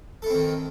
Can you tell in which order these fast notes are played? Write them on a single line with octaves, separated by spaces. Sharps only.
A4 E4 C4 D#3